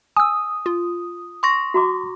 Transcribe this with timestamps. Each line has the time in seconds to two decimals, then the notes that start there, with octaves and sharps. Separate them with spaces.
0.17 G#5 D#6 E6
0.66 F4
1.43 C6 C#6 A#6
1.74 F#4 A#5 D6